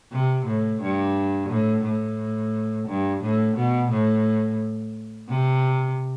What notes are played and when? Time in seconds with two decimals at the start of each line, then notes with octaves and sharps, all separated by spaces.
0.12 C3
0.46 A2
0.82 G2
1.50 A2
1.84 A2
2.88 G2
3.22 A2
3.57 B2
3.91 A2
5.28 C3